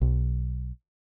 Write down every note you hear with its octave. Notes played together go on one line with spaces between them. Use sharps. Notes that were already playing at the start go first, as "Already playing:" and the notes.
B1